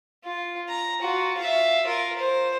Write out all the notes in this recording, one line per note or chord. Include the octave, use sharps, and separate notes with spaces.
F4
A#5
F4 F#4
E5 F5
F4 A#4
C5